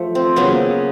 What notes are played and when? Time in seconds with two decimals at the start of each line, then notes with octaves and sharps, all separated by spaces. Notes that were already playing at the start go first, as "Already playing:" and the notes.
Already playing: F3 A3
0.15 C4
0.36 C#3 F#3 A#3 B3